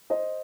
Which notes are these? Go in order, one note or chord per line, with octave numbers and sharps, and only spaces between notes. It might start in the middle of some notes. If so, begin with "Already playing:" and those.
C5 D#5